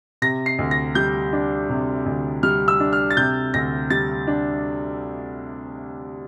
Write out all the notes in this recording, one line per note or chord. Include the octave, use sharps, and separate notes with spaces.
C3 A#6
C7
D2
A#6
G3 G6
D4
C3
D2
G3 F6
E6
D4
F6
A6
C3 G6
D2 A#6
G3 A6
D4